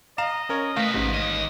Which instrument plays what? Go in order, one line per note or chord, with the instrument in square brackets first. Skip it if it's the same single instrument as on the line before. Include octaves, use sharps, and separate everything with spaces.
[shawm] D#5 [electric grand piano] F5 A#5 E7
[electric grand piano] C#4 A#4 C#5
[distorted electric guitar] C3 B4 [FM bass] A3 [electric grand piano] F5
[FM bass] A1 [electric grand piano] G#2
[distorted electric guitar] D#2 D#5